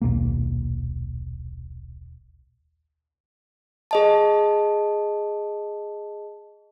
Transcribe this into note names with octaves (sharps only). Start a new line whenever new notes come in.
D#1 B1 A#3
G#4 D#5 A5